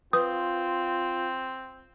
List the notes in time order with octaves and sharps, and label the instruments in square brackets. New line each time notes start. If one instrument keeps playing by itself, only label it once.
[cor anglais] C4 [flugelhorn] F4 [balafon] B4 [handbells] D#6